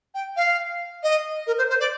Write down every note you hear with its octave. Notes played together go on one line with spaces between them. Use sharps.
G5
F5
D#5
A#4
C5
C5
D5